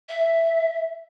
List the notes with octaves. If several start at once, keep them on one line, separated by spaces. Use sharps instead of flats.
E5